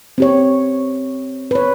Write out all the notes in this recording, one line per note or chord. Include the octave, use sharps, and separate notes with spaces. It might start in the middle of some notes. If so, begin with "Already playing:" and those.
C4 G4 C#5
B4 C#5